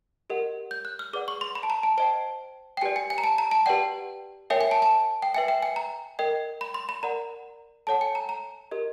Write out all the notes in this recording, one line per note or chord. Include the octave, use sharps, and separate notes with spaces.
G4 A#4 D#5 F#5
G6
F#6
F6
G#4 B4 D5 F#5 D6
C#6
C6
B5
A5
A#5
A5
C5 D#5 G5 A5
G5
G4 B4 D5 G#5
G#5
G#5
A#5
A5
A#5
A5
G4 B4 D5 F#5 G5
A#4 C#5 E5 G5 G#5
G#5
A5
A5
G5
B4 E5 G5 G#5
G5
G#5
A#5
A#4 D#5 G5
B5
C6
B5
A#4 D5 F#5 A#5
A4 C#5 F#5 A5
G#5
A#5
A#5
G4 A#4 D#5